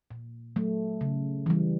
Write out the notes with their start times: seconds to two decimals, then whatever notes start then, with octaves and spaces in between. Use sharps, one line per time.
0.11 A#2
0.56 F#3 A3
1.01 C#3
1.46 E3 G3